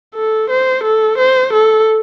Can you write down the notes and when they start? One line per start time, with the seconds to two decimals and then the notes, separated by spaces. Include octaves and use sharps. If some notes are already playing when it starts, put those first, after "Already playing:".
0.15 A4
0.50 C5
0.84 A4
1.18 C5
1.54 A4